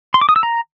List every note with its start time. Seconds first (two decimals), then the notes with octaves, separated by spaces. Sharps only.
0.14 C6
0.21 D6
0.29 D#6
0.36 E6
0.43 A#5